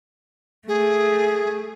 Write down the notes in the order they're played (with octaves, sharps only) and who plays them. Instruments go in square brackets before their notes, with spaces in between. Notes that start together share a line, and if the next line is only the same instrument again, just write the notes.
[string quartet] A3 [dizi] G#4